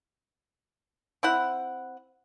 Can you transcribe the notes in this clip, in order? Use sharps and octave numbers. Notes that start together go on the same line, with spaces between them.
C4 E4 F#5